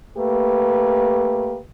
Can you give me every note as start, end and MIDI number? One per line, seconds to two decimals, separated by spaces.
0.18 1.59 57
0.18 1.59 58
0.18 1.59 67
0.18 1.59 71